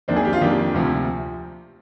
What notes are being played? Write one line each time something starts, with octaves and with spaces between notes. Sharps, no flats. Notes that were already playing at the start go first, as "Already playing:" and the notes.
F2 D#3 A#3 D4 C5
G#4
G4
F4
F2 D#3 A#3 D4 G4
D2 C3 F3